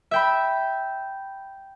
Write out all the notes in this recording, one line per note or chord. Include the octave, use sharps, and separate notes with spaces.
E5 G5 B5